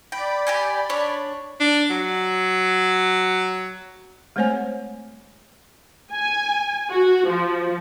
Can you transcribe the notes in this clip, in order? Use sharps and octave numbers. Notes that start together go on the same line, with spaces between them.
D5 G5 B5
G4 G5 G#5
D4 C#5
D4
F#3
G#3 A3 C4 C5 C#5 G#5
G#5
F#4
F3